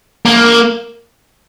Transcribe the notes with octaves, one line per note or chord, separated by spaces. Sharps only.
A#3